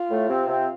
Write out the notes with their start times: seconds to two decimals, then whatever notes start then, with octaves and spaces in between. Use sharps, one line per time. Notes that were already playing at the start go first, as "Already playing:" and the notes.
Already playing: F4
0.11 A2 A3
0.29 C3 C4
0.48 C3 C4